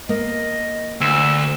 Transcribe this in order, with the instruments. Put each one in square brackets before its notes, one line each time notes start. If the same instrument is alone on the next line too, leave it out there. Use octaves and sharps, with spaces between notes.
[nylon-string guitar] A#3 [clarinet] D#5
[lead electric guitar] D2 [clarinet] E6